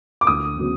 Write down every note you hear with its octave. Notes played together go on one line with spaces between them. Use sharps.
D6
D2 D#6
C#3 F#3 B3